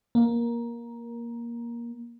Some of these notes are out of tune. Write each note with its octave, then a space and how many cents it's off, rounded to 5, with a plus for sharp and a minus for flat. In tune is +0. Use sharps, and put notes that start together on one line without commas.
A#3 +15